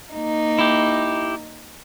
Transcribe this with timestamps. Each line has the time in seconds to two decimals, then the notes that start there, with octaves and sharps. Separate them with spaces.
0.13 A#3 D#4
0.59 E4 G4